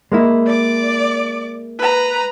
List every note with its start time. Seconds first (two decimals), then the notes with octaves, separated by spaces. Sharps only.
0.12 G#3 A#3 E4
0.46 D5 D6
1.79 B4 A#5